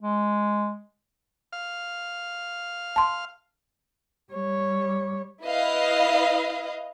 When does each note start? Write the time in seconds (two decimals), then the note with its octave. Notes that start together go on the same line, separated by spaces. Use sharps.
0.01 G#3
1.53 F5 F6
2.96 A5 C6
4.33 G3 C#5
5.43 E4 B4 D#5 F5